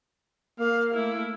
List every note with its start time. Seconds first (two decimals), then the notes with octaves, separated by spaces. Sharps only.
0.59 A#3 F5
0.94 A3 E4